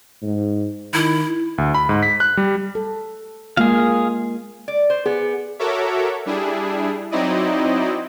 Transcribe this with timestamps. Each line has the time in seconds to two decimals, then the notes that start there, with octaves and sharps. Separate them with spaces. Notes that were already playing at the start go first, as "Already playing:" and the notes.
0.22 G#2
0.94 D#3 E4
1.58 D2
1.74 B5
1.89 G#2
2.03 B6
2.20 F#6
2.37 G3
2.75 A4
3.57 G#3 A#3 F4 G#4 F5
4.68 D5
4.90 C5
5.06 B3 G#4
5.59 F#4 A4 A#4 C#5 E5 D6
6.26 G3 D4 E4 G#4
7.11 F#3 C4 D#4 E4 D5 D#5